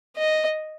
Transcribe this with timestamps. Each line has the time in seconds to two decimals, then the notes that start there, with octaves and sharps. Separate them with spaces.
0.17 D#5